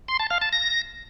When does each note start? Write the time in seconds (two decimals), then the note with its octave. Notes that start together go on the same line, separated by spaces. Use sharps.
0.08 C6
0.19 A5
0.30 F5
0.42 A5
0.53 A#6